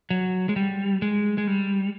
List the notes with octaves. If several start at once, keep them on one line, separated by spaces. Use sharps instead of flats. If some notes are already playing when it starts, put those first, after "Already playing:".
F#3
G#3
G3
G#3
G#3
G3